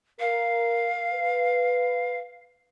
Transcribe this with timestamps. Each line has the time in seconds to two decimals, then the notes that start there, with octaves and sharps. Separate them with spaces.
0.20 A#4 F5
1.12 B4